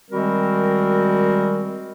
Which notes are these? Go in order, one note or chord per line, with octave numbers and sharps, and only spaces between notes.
D#3 G3 G#3 C4 F#4 A#4